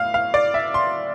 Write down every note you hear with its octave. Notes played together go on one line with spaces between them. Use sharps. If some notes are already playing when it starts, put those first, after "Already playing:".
Already playing: A2 B3 F5
F5
D5
E5
C6